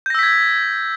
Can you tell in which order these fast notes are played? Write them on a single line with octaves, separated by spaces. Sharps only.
G6 A#6 E6 B6 G#6